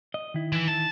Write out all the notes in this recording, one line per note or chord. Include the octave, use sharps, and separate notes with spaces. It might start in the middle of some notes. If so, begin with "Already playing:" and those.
D#5
D#3 E4
E3
A5